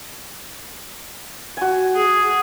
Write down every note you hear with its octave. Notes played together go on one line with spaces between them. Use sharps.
F#4 G#5
G#4